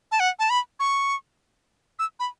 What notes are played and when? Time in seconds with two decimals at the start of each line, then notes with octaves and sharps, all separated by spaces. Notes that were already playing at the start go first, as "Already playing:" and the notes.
0.12 A5
0.20 F#5
0.39 A5
0.50 B5
0.80 C#6
1.99 E6
2.20 B5